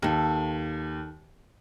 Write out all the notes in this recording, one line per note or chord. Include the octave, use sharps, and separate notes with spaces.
D#2 D#4 A4